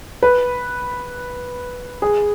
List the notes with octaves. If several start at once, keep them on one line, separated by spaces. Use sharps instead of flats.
B4
G#4